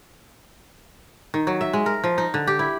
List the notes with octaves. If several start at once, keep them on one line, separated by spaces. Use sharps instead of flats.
D#3
F#3
E5
G#3
A#4
F3
D#4
D3
G4
E4